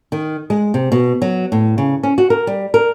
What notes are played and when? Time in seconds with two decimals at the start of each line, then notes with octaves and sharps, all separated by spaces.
0.12 D#3
0.50 G#3
0.74 C3
0.92 B2
1.22 F#3
1.52 A2
1.78 C#3
2.03 C#4
2.18 F#4
2.30 A#4
2.47 G3
2.74 A#4